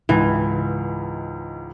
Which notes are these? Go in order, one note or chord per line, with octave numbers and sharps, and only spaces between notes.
C#2 G#2 E3